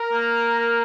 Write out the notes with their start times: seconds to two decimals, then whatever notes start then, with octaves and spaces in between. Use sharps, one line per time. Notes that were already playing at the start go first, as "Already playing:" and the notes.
Already playing: A#4
0.13 A#3